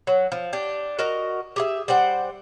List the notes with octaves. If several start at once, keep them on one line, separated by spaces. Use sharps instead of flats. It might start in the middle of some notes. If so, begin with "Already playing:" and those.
F#3
F3
D4 G4
F#4 A#4 D#5 A#5
G4 G#4 E5
G3 C5 F#5 G5